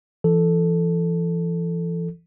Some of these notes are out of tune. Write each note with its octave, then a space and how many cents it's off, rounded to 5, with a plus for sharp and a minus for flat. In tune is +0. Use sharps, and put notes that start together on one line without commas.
E3 +30 A4 +0